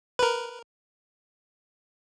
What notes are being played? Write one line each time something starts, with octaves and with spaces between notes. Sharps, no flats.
A#4 B4